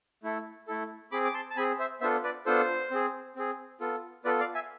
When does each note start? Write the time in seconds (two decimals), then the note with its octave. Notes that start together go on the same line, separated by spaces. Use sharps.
0.23 A3 E4 A4
0.67 A3 E4 A4
1.11 C4 G#4 B5 D6
1.24 D6
1.34 A5 C6
1.50 A5
1.56 C4 G#4 G#5 B5
1.79 C5 E5
2.01 B3 D4 F4 A4 C5 E5
2.23 B4 D5
2.46 B3 D4 F4 A4 C5
2.91 C4 G#4
3.36 C4 G#4
3.80 B3 F4 A4
4.25 B3 F4 A4 B4 D5
4.40 D5 F5
4.55 E5 G#5